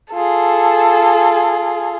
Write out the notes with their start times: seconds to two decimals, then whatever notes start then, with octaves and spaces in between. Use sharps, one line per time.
0.14 F4 G#4 A4